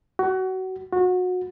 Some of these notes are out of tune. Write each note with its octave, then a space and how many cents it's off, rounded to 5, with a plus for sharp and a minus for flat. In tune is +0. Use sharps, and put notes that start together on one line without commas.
F#4 +25
F#4 -25